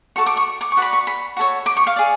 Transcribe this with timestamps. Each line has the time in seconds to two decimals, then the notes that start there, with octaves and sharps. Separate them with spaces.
0.16 F#4 A4 D5 C#6
0.26 D6
0.37 C#6
0.61 D6
0.72 C#6
0.77 F#4 B4 D5 B5
0.93 C#6
1.07 B5
1.37 F#4 A4 C#5
1.66 D6
1.77 C#6
1.87 F5
1.96 G#4 D5